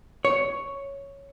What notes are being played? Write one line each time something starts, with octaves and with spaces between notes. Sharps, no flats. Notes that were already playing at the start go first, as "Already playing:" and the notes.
C#5